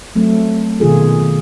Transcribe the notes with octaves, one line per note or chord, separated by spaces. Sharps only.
F#3 A3 C4
B2 D#3 F4 G#4 A4
D#3